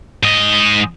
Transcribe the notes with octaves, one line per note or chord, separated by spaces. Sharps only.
G#2 D#5